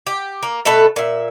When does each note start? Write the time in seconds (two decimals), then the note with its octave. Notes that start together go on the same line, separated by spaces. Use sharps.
0.07 G4
0.43 A#3
0.65 B2 A3 A4 B4
0.96 A#2 E5